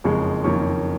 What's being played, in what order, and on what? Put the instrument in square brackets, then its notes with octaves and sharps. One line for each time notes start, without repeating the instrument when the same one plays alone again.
[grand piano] F#1 F2 C#3 G#3 C#6
F#1 F2 D#3 A#3 C#4 C#6